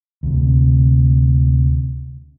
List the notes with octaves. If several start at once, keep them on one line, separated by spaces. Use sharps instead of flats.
D2 C3